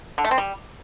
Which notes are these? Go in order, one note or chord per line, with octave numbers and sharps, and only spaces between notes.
D3
A3
C4
G3